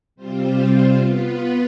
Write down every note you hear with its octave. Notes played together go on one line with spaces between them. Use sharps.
C3 G3 C4 F4 C5
B3 F4 B4